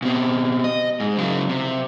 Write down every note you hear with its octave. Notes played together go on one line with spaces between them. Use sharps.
B2 C4
D#5
G#2
C#3 F#3
C3